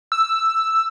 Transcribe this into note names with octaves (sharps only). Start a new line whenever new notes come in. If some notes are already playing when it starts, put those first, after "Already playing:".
E6